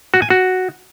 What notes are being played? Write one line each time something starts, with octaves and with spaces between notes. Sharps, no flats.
F#4
G#5
F#4